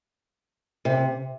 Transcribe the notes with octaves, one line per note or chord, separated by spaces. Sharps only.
C3